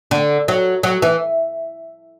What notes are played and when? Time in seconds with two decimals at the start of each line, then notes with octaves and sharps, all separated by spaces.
0.11 D3
0.48 F#3
0.83 F#3
1.02 E3